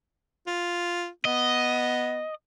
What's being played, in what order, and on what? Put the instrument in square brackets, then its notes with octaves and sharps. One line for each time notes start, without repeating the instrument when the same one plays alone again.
[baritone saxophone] F4
[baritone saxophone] B3 [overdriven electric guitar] D#5